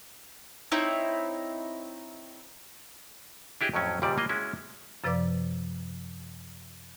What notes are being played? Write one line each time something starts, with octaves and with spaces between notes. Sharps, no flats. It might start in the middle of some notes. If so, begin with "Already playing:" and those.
C4 D#4 E4 C#5
D4 E4 G4 G#4 D#5
F2 A2 F#3 C#4
D#2 A#2 C#3 G3 D5
E3 A#3 F4 D#5
G#3 C#4 E4 F#4
F#2 C3 F3 B4 D5 D6